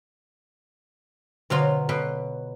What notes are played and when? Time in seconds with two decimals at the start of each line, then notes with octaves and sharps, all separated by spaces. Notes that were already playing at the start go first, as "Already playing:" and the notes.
1.50 B2 D3 F#3 F4
1.89 B2 B4